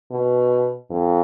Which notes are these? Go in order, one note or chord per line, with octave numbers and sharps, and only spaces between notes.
B2
F2